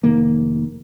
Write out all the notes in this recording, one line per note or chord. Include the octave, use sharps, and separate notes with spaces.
F1 D#3 A#3